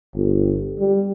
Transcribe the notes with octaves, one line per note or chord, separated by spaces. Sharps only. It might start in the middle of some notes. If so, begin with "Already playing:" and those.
G1
G3